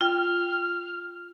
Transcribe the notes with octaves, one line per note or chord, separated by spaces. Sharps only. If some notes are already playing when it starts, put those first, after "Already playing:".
F4 G5 F6